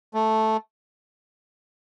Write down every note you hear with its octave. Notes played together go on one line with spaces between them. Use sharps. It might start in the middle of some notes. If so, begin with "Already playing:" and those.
A3